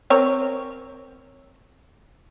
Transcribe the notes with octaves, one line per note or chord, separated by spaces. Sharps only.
C4 A#4 C#5